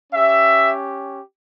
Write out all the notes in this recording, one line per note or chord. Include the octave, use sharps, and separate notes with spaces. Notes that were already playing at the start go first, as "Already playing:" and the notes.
C#4 G4 E5